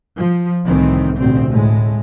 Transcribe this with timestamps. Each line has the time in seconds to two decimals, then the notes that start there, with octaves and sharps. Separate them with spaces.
0.16 F3
0.65 C2 A2 D#3 E3 C4
1.17 A1 D2 B2 C4
1.51 A2 G#3